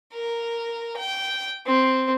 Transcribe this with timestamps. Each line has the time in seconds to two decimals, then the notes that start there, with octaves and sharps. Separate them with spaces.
0.13 A#4
0.97 G5
1.66 C4